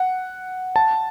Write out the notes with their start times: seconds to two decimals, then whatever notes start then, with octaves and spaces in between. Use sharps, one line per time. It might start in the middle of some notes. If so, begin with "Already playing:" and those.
Already playing: F#5
0.76 A5